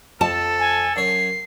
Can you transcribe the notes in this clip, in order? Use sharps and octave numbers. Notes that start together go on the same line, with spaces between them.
F2 A4 A5
G#5
F#2 C#5 C7